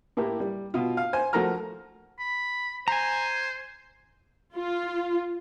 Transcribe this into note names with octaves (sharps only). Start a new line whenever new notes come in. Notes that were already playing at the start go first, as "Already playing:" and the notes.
A2 A#3 E4 G4
G3
B2 F4
F5
C5 G#5
F3 A3 F#4 A#4 A#5 F6
B5
C5 G#5 A#5
F4